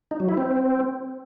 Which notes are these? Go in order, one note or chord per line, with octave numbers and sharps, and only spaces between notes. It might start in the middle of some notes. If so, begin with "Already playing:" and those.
D#4
F#3
E4
C4